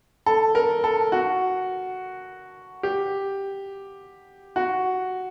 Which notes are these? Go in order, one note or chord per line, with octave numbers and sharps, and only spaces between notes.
A4
A#4
A4
F#4
G4
F#4